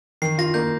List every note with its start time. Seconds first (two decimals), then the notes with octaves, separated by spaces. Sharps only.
0.22 D#3 C7
0.38 F4 A#6
0.54 A#3 G6